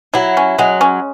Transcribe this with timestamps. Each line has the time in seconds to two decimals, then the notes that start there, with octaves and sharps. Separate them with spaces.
0.14 F#3 E4
0.37 C#4
0.58 F#3 G#3
0.81 C#4